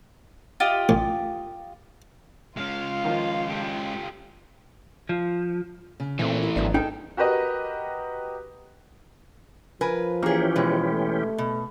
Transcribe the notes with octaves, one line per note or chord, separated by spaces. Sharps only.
F4 G4 D#5
A1
G#3 C#4 F4 F5
D#3 F3 D#4
G4 A4
F3
C#3
A#2 E3 A3 C4 D#4
E4
G#1 F#3 B3 D4
D#4 G#4 A4 G5
F#4 G4 A#4 B4 D#5
F3 A#4 B4 G#5
E3 A#3 C#4 G4 G#4
B2 G#3
A3
B2